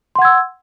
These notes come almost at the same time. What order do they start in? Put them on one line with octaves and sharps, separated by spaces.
C6 F#5 G#6 E6